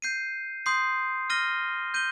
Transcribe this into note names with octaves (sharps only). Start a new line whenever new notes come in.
G6 C7 D#7
C6 D#6 G6 C7
F6 A#6 D#7 G7
G6 D#7 G7